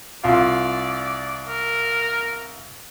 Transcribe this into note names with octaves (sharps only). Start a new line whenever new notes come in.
C2 F4 D5 F5
A#4